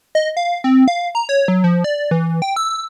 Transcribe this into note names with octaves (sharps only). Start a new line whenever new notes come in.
D#5
F5
C4
F5
A#5
C#5
F#3
F3
D5
E3
G5
E6